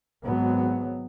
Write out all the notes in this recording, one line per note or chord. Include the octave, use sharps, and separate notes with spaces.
G#1 F#3 B3